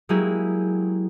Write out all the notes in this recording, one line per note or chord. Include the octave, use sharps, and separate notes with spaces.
F#3 G#3 A#3 E4 G4 G#4